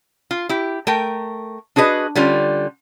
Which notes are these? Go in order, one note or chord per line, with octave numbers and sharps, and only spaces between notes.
F4
E4 G4
A3 A#4 G5
D4 F#4 G#4 B4 D#5
D3 G3 C#4 F4